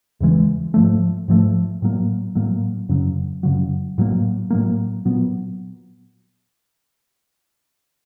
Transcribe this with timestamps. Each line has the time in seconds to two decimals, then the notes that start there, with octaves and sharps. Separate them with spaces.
0.20 E2 C#3 E3 G#3
0.74 G#2 F3 A3
1.28 G#2 F3 A3
1.82 A2 F#3 A#3
2.35 A2 F#3 A#3
2.89 F#2 C#3 F#3
3.43 F#2 C#3 F#3
3.98 A2 F#3 A#3
4.50 A2 F#3 A#3
5.05 A#2 F#3 B3